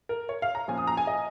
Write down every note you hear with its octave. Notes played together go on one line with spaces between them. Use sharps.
A#4
C#5
F5
A#5
A#2 F3 C#4 F4 G#5
D#6
A#5
G#5
D#5